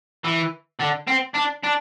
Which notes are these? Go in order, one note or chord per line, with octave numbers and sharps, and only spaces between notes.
E3
D3
C4
D4
D4